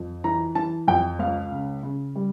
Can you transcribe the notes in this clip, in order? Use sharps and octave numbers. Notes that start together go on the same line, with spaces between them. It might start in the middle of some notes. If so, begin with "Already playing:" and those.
Already playing: F2
E3 A#5
E3 A5
F2 G5
C#2 F5
C#3
C#3
G3